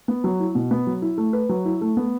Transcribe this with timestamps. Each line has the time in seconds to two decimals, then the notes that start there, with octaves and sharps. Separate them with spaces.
0.08 B3
0.24 F#3
0.40 E4
0.55 B2
0.71 B3
0.87 F#3
1.02 E4
1.18 A3
1.33 B4
1.49 F#3
1.65 E4
1.81 A3
1.97 B3